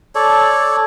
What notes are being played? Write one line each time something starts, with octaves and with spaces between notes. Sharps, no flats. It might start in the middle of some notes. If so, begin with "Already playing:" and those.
A4 C#5 D5